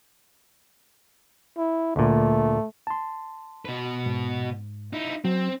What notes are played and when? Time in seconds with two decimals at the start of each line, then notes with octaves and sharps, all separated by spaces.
1.57 E4
1.96 D2 A#2 A3
2.87 A5 C6
3.65 B2 B4
4.06 G#2
4.93 D#4 E4
5.25 F#3 C4